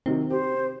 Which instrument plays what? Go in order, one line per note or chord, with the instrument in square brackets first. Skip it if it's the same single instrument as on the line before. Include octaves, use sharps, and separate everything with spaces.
[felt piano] C3 D#3 F#3 [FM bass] C4
[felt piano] G4 [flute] C5